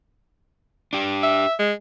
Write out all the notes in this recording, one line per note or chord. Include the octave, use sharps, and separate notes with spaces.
D4 G4
E5
G#3